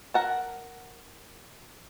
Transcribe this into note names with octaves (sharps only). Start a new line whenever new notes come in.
A#4 F#5 A5